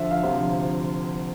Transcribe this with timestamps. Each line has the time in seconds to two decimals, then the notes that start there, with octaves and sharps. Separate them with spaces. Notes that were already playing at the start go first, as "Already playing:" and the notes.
Already playing: D3 F3 E5
0.11 F5
0.23 D2 C3 F3